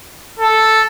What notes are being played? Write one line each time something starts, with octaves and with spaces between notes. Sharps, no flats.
A4